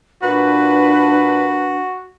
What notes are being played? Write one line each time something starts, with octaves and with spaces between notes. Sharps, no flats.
A#2 D4 F#4 B4